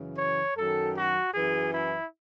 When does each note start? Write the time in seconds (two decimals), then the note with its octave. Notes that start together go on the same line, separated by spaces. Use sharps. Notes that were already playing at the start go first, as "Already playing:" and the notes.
Already playing: F#2 C#3 E3
0.18 C#5
0.56 F#2 D#3 F#3 A4
0.95 F#4
1.33 F#2 E3 G#4
1.71 E4